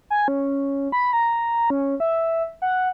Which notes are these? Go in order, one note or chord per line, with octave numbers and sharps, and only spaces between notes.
G#5
C#4
B5
A#5
C#4
E5
F#5